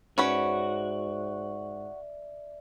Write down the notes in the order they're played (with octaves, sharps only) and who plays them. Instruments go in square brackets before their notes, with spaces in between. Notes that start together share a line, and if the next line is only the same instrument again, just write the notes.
[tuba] G#2 [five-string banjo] C#4 B4 C#5 [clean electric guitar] F#4 [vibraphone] D5 E5